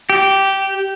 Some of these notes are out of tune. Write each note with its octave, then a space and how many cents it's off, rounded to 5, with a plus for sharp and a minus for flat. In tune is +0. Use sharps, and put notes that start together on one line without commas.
G4 -10